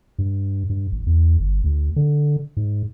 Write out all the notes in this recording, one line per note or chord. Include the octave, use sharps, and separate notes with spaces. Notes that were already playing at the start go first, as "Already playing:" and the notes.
G2
G2
A1
E2
G1
D2
D3
G#2